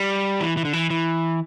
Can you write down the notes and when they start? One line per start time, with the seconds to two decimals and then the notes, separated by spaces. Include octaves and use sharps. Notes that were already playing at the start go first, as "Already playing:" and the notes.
Already playing: G3
0.40 E3
0.57 E3
0.65 D3
0.73 E3
0.90 E3